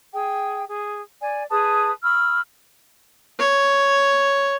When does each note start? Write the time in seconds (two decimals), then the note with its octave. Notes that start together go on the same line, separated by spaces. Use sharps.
0.13 G#4 G5
0.68 G#4
1.21 D5 G#5
1.51 G#4 B4 A5 D#6
2.03 B5 C#6 E6 F6
3.39 C#5